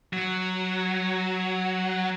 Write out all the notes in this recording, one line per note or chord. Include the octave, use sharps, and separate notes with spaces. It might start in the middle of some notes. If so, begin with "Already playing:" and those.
F#3